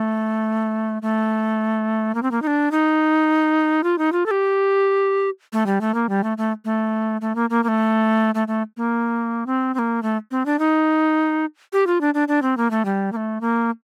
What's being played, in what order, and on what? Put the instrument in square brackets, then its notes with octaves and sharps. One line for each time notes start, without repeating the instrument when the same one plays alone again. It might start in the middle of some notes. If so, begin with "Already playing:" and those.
Already playing: [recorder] A3
A3
A#3
C4
A#3
D#4
D4
D#4
F4
D#4
F4
A4
G4
A3
G3
A3
A#3
G3
A3
A3
A3
A3
A#3
A#3
A#3
A3
A3
A3
A#3
C4
C4
A#3
A3
C4
D4
D#4
G4
F4
D4
D4
D4
C4
A#3
A3
G3
A#3
A3
A#3